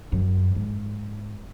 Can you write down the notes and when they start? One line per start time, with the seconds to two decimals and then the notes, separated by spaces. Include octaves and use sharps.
0.12 F#2
0.55 G#2